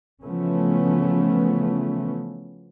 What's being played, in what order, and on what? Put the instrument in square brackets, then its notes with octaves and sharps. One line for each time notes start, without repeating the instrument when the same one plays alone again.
[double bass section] C#3 E3 F3 A3 B3 C#4